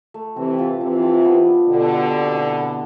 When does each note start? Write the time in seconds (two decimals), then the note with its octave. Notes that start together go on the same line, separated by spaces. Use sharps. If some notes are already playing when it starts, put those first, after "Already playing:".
0.14 A3
0.36 C3 E3 C4
0.59 F4
0.80 C3 E3 F3
1.03 F3
1.25 B3
1.47 D4
1.69 B2 D3 G3
1.91 G3
2.13 C4
2.35 E4
2.57 B3